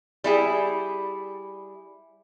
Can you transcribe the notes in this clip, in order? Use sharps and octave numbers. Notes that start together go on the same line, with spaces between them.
G3 E4 G#4